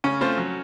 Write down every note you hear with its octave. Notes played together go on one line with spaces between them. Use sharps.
C#3 C#4
A3 C4 F4 C5
F#3